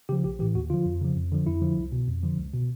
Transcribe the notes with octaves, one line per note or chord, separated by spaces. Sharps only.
C#3 F3 G4
A#1 G4
A2 E3 G4
D#2 F#4
D3 F3 F4
F2
C#3 F3
F2
D3 F3
F2 E4
D3 F3
C2
B2
F2
D3 F3
C#2
B2